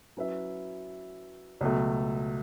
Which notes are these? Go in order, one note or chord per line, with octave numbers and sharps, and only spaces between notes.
F#3 C#4 E4 B4 E5
C#2 B2 F#3 A3